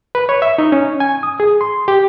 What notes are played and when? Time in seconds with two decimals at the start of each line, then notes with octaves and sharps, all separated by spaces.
0.15 B4
0.29 C#5
0.42 E5
0.58 D#4
0.72 C#4
1.00 G#5
1.23 D#6
1.40 G#4
1.61 C6
1.88 G4